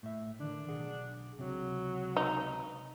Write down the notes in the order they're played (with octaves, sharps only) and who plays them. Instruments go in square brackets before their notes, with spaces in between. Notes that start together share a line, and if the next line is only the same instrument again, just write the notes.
[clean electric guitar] A2 E5
[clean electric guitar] D3 D#3 [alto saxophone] D4
[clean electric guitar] B1 G#4 F#5
[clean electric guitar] C#2 F#2 C3 [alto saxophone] F#3
[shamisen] D#4